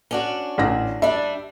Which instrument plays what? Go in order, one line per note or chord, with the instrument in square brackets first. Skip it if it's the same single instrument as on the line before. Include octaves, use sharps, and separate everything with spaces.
[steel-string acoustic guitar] C#4 D4 F#4
[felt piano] A1 A#6
[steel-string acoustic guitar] G3 D4 [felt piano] E5